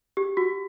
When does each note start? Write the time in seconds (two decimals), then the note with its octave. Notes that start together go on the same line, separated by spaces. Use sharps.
0.17 G4
0.37 F#4